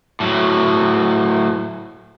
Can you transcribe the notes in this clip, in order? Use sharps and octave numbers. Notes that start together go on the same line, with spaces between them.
A2 F#3